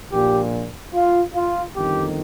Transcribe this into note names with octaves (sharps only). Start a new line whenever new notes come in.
A#1 A#2 G4
F4
F4
G1 F2 D#3 G4